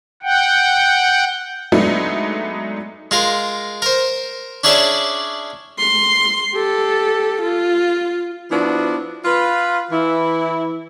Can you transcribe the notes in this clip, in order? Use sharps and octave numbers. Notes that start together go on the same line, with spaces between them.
F#5 G5
F#3 G#3 A3 B3 D4 D#4
G#3 F4 A#4
A#4 C5
C#4 D4 E4 G#4 C#5 D5
C6
G4 A4
F4
F3 B3 D4 E4 F#4
F4 B4
E3 E4